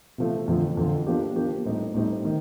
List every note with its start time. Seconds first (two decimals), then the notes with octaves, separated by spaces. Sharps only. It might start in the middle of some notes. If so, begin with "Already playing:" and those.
0.18 C3 F3 A3
0.48 F2 D3 F3
0.77 F2 D3 F3
1.07 F3 A#3 D4 G4
1.35 F3 A#3 D4 G4
1.65 A2 G3 C4 D#4
1.94 A2 G3 C4 D#4
2.25 D#3